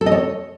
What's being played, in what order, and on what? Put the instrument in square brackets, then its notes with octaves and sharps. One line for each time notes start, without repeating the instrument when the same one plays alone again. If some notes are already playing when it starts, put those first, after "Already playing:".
[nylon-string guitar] A4
D#5
C#5